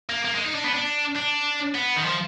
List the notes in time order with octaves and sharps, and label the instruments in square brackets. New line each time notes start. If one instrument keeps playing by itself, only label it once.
[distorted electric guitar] A#3
A#3
G#3
D#4
D4
B3
D4
D4
B3
D#3
F3